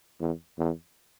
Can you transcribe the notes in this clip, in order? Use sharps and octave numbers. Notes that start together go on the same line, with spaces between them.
E2
E2